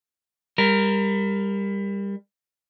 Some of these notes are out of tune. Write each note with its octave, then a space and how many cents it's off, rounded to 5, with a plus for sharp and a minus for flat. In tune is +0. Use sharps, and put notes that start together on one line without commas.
G3 +25 A#4 +0